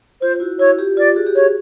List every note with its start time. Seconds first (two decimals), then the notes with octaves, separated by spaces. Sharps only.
0.21 F4 C5
0.40 E4 F#4
0.59 E4 F#4 C#5
0.79 F4 G4
0.97 F4 G4 D5
1.16 F#4 G#4
1.27 G4
1.35 F#4 G#4 C#5